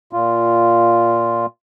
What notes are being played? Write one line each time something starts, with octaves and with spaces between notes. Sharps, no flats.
A#2 F4